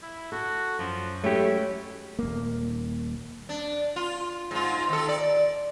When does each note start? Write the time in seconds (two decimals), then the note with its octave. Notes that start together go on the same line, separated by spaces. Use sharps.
0.03 E4
0.32 F#4 A4
0.79 F#2 F3
1.24 F#3 G#3 A3 C#4 E4 G4
2.19 D#1 A#3
3.49 D4
3.96 F4
4.51 G#2 F4
4.89 D#3 A4
5.08 D5